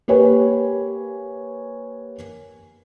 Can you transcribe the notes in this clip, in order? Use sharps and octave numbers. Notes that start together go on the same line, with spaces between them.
A#3 G4 B4 C#5 G#5